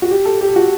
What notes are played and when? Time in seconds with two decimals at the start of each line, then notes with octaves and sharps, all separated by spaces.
0.02 F#4
0.11 G4
0.25 A4
0.41 G4
0.56 F#4